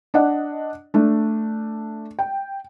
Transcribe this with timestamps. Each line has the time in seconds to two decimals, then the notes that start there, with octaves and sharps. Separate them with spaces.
0.14 D4 D5 D#5 F#5
0.94 A3 D4
2.19 G5